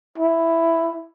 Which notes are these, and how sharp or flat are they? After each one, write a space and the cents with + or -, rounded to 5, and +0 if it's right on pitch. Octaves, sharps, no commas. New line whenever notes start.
E4 +5